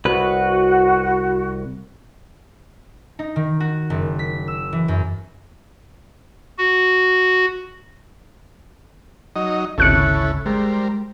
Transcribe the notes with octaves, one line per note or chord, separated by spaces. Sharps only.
C2 F#4 B4
D#4
D#3
F#4
F#1
B6
E6
E3
F#2
F#4
F#3 D#4 D#5
G#1 D2 C#3 C#4 E4 A4 F#6 C#7
G3 G#3 A#4 C5